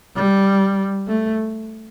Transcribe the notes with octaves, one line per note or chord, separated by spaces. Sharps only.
G3
A3